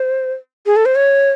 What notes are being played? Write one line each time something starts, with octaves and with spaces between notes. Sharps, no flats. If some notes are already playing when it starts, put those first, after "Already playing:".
Already playing: C5
G#4
A4
C5
C#5